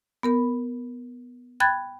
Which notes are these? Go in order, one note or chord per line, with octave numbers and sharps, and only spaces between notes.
B3 A#4 B5
G5 B5 F#6 G#6 A6